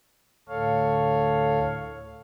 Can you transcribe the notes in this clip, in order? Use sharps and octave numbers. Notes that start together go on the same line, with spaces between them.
D2 A2 A4 C#5 F5